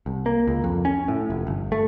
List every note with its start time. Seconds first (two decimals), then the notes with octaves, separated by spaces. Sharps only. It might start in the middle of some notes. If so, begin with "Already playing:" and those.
0.06 C2
0.26 A#3
0.47 C#2
0.64 F2
0.85 C#4
1.08 A2
1.30 F1
1.47 G1
1.72 A3